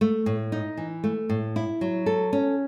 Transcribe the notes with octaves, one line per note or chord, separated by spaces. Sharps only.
A3
A2
D#4
E3
A3
A2
E4
F#3
A4
C#4